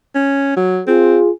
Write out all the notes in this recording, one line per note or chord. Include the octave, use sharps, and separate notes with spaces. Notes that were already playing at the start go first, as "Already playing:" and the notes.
C#4
F#3
C4 F4 G#4